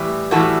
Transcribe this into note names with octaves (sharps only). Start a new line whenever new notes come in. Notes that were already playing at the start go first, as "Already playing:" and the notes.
Already playing: A2 E3 G3
A2 E3 G3 F#4 A4